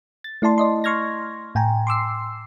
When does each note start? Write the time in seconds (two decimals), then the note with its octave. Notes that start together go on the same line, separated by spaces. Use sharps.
0.24 A6
0.42 A3 E4 D5 A5 C6
0.58 D5 D#5 C6
0.84 C6 C#6 F6 G#6 A#6
1.55 A2 G5 G#5 A#5
1.87 C6 D6 E6 C7